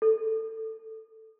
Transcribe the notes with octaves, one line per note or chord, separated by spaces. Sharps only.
A4